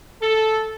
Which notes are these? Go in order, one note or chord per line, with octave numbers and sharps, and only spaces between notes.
A4